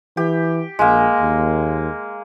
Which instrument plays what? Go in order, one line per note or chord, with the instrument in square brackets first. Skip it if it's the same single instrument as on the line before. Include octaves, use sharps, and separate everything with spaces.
[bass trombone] E3 [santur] G4
[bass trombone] A#1 [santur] G#3 A#3
[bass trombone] D#2